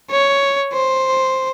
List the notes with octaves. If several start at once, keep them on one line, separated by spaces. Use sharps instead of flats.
C#5
C5